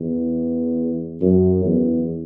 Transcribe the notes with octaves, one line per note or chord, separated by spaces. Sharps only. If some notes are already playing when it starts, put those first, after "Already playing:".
Already playing: E2
F#2
E2